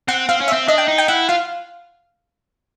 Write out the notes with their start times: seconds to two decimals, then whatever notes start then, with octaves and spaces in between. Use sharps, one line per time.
0.08 C4 F#5
0.29 C4 F5
0.41 C#4
0.48 C4 E5
0.68 D4 D#5
0.78 G5
0.88 D#4
0.98 G5
1.08 E4 F#5
1.29 F4 F5